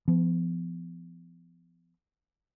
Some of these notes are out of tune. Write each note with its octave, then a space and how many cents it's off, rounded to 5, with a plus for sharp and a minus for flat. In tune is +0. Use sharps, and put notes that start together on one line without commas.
F3 -30 B3 +30